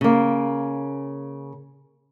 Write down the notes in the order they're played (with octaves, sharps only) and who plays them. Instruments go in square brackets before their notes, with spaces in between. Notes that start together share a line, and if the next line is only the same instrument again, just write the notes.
[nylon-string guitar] C#3 A#3